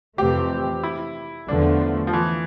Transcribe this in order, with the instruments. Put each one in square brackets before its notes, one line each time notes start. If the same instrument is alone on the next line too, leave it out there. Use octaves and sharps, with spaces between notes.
[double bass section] F2 C3 E3 A3 C4 [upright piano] G4
[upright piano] E4
[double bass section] E2 D3 F3 A3 [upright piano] D4
[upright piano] F3
E3